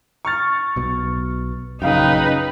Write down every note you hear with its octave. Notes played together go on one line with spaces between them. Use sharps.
C#6 F6 A6
B1 B2
A#1 F#2 C#3 D#4 B4 F5 G5